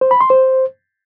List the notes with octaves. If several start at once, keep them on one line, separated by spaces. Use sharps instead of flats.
C5
B5
C6
C5